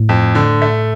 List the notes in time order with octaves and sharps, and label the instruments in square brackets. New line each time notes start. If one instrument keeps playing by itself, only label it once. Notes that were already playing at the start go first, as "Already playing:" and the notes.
Already playing: [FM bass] A2
[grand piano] F2
D3
A3